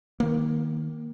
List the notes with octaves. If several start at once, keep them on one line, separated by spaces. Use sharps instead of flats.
D#3 A#3